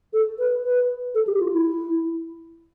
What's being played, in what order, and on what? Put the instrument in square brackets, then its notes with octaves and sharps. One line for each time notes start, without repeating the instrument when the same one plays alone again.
[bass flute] A4
B4
B4
A4
G4
F4
E4